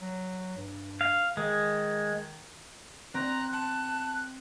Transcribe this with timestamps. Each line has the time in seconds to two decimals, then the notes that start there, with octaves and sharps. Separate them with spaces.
0.01 F#3
0.57 G2
1.01 F5
1.37 D#3 G#3
3.14 C4 A#5 F#6
3.53 A5 F#6